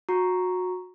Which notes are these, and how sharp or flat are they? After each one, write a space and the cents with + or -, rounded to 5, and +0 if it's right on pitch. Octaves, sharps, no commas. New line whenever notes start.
F#4 -25 A#5 +0 C#6 +0